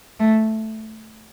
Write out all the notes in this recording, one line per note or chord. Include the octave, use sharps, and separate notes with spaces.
A3